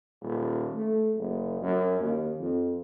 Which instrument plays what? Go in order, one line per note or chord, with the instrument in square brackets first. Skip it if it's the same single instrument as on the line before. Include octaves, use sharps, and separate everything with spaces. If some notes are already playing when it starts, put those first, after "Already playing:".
[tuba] D#1
A3
F#1
F#2
D#2
F2